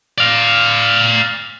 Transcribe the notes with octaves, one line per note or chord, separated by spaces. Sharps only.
D5 F5